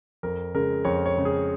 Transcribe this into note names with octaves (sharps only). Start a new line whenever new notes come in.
F2 A#4
C#3 G#3 A#4
F2 C#5
C#5
C#3 G#3
G#4